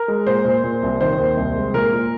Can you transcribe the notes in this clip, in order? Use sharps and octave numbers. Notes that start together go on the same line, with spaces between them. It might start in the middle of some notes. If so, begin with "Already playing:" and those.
Already playing: A#4
G#3
A#2 C5
A#2
A#2
C2
D#3 C5
D#2
C2
G#3
A#2 A#4
A#2